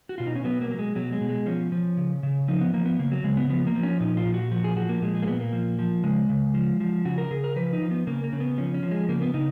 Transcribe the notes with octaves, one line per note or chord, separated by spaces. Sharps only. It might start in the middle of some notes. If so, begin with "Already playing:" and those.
F#4
B2 F4
D#4
C#4
F#3 B3
A#3
F#3
G#3
B2 F#3
G#3
B2
G#3
F3 C#4
F3
C#3
C#3
F3 D#4
B3
F3 A#3
B3
C#3 A#3
F#3
C#3 G#3
B3
F3 B3
A#3
F3
C#4
A#2 D#4
F4
A#2
F#4
F3 F#4
G#4
F3 F#4
A#3
A#2 G#3
G#3
A#3
A#2 B3
A#3
F3
F3
C#3 G#3
C#3
F3
F3
C#3 F#4
A#4
C#3 G#4
A#4
F3 B4
D#4
F3
B3
C#3 A#3
A#3
C#3
B3
F3 C#4
C#4
F3
G#3
C#3 A#3
B3
C#3 D#4